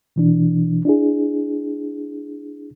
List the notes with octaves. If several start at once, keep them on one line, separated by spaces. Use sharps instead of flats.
B2 E3 D4
D4 E4 G#4